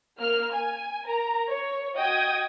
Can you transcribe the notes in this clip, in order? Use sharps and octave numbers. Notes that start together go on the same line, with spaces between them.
A#3 F6
G#5
A#4 A#5
C#5
F#4 D#5 G5 D#6 G#6